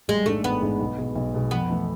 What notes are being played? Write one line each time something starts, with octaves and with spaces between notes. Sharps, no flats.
A1 G#3
G#2 G#3 A3 D4
A1 B3
G#2 G#3 D4
B1
B2 G#3
B1
B2 G#3
F2 B3
E3 A3 E4